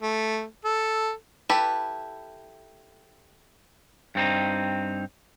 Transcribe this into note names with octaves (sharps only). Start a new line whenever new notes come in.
A3
A4
E4 G4 A4 B4
G2 C4 D#4